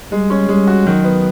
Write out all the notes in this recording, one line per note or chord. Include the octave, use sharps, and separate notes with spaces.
G3 G#3
C#4
G3 G#3
F#4
D#3 F#3
B3